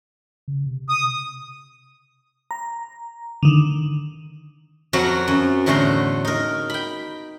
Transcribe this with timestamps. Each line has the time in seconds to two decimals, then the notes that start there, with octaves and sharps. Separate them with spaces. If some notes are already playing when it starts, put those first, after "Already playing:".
0.48 C#3
0.66 C3
0.89 D#6
2.51 A#5
3.43 D3 D#3
4.93 F2 F#3 F#4 A#4 C#5 F#5
5.28 F#2
5.66 E2 A2 D3 F#4 A#5 C6
6.25 D#4 A#4
6.70 G5 B5